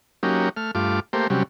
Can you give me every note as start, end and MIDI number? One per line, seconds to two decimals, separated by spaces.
0.23 0.49 54
0.23 0.49 58
0.23 0.49 61
0.23 0.49 63
0.23 0.49 67
0.57 0.71 57
0.57 0.71 89
0.75 1.00 43
0.75 1.00 57
0.75 1.00 65
0.75 1.00 86
1.13 1.27 57
1.13 1.27 58
1.13 1.27 67
1.13 1.27 72
1.30 1.43 48
1.30 1.43 54
1.30 1.43 55
1.30 1.43 61